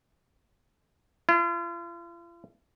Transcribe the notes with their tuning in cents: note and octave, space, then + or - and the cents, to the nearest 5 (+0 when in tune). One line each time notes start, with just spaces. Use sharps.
F4 -40